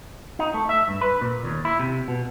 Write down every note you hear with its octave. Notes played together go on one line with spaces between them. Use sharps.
D#4
A3
E5
G2
B4
A#2
D#2
E4
C3
B2